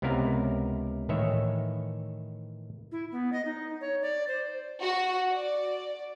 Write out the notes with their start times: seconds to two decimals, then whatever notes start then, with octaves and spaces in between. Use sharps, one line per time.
0.02 C#2 C3 B3 E4 A#4 F5
1.09 A2 D#3 E3 C#5 E5
2.92 E4
3.12 B3
3.33 D#5
3.45 D#4
3.81 C#5
4.02 D5
4.28 C5
4.82 F#4
5.35 D5